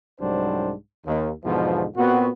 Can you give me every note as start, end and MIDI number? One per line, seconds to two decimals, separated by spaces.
0.20 0.73 36
0.20 0.73 44
0.20 0.73 54
0.20 0.73 55
0.20 0.73 62
0.20 0.73 72
1.06 1.31 39
1.45 1.85 40
1.45 1.85 44
1.45 1.85 47
1.45 1.85 50
1.45 1.85 53
1.96 2.29 46
1.96 2.29 59
1.96 2.29 60
1.96 2.29 66